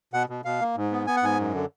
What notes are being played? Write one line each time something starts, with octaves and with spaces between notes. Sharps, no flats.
B2 F#5
B2
B2 F5
A#3
G#2
B3
B3 G#5
F#5
G#2 G#5
F#2
D3